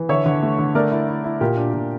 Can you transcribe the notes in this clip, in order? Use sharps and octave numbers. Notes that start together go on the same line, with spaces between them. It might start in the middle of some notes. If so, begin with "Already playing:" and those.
Already playing: E3
D3 C#5 E5
D3
A3
D3
A3 A#4 D5
E4
E4
E4
A#2 G4 A#4
D4
A#2